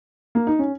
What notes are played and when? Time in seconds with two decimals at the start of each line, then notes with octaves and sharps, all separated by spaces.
0.35 A#3
0.47 D#4
0.59 C#4